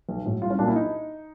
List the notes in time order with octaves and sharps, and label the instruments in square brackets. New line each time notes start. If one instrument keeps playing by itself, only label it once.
[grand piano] B1
A2 F#3
C2 F4
C#4
A#2 F#3 A#3 D4
E4
D#4